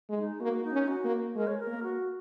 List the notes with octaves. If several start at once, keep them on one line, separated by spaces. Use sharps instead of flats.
G#3
D#4
A#3 F#4
D#4
C#4
F#4
A#3
G#3 A#4
C#5
A#4
A#3
F#4